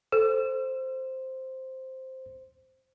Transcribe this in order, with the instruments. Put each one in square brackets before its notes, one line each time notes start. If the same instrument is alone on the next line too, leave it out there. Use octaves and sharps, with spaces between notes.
[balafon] A4 [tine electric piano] C5